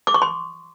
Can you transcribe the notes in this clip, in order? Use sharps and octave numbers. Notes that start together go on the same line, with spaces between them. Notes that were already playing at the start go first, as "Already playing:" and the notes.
D6
C#6
C6